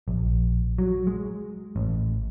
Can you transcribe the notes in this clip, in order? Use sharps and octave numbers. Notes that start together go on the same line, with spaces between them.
A#1
F#3
G#3
A1